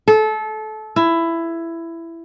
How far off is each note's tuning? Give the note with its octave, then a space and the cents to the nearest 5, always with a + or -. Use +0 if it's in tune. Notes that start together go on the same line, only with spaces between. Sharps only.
A4 -25
E4 +15